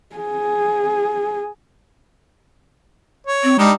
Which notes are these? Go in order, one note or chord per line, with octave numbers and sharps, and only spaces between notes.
G#4
C#5
C4
G3 G#3 D4 D#4